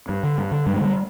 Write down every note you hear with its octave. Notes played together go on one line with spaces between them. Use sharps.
G2
D3
G2
D3
G2 G3
G#3
D3 G3